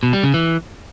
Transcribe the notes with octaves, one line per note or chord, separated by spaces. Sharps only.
B2
G3
C#3
E3